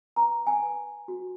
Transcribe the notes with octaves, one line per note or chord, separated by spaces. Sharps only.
B4 A#5
G#5
B4
F#4